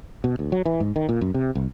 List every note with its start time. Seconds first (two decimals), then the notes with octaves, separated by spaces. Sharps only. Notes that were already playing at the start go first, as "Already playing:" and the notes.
0.24 B2
0.39 D2
0.52 F#3
0.66 E3
0.80 G#2
0.96 D#3
1.09 A#2
1.21 F#2
1.34 C3
1.55 C2